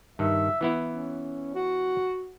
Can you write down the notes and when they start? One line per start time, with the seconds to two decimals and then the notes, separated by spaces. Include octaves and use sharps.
0.19 G2 D#3 E5
0.61 E3 B3 E4
0.89 C#4
1.55 F#4